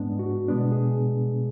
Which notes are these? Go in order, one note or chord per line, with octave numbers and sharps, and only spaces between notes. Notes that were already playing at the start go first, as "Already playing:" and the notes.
Already playing: G#2 G#3 B3 D4
F#4
B2 G#3 B3 D4
G#4